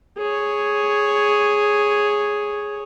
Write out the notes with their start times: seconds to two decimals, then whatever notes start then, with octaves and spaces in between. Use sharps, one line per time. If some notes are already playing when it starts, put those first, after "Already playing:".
0.18 G#4 C#5